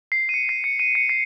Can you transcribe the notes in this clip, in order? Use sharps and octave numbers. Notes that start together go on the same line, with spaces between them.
C7
D#7
C#7
C7
C#7
D#7
C#7
C7